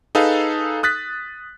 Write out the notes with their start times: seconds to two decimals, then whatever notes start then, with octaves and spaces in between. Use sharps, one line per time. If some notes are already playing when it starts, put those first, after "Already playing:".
0.15 D#4 G#4 A4 B4 F5
0.83 D#6 F#6 A6 B6